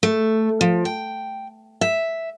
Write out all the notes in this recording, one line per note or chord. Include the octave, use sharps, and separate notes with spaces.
A3
F3
G5
E5